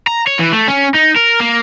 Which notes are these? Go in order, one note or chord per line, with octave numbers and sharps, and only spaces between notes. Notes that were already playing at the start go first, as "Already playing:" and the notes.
A#5
C#5
E3
A3
C#4
D#4
A#4
A#3